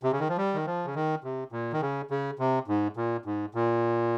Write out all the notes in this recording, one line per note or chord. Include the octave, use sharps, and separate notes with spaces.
C3
C#3
D#3
F3
G3
D#3
F3
C#3
D#3
C3
A#2
D#3
C#3
C#3
C3
G#2
A#2
G#2
A#2